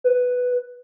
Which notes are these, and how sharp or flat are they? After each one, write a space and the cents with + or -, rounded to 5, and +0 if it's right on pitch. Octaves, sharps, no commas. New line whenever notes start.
B4 +5